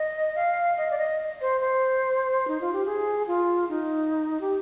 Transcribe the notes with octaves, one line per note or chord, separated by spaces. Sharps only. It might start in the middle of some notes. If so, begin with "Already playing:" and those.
Already playing: D#5
F5
D#5
D5
D#5
C5
C5
D#4
F4
G4
G#4
F4
D#4
G4